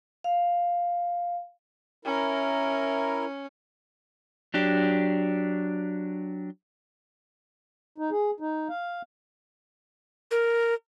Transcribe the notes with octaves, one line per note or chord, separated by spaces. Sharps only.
F5
C#4 E4 A#4
F#3 D4 G4
D#4
G#4
D#4
F5
A#4